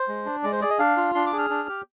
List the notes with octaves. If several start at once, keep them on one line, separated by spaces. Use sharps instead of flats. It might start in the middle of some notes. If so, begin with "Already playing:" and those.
Already playing: C5
G#3
D4
G#3 D5
C5
G#4 D5
D#5
D4 F5
F4
D4 C6
D6
G#4
F6
D4
G4